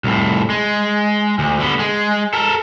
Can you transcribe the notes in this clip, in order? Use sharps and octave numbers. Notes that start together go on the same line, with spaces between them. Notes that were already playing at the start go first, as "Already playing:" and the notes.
C2 A2
G#3
D2
D3 B3
G#3
A4 A#4